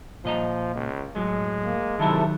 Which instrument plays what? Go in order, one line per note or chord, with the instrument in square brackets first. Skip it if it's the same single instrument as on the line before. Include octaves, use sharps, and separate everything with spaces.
[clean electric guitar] A#2 D#5 A#5 [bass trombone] F3
[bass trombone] C#2
[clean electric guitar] A2 F#3 [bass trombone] G#3
[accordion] A#3
[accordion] C3 E4 A4 [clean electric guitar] D#3 F#3 A#4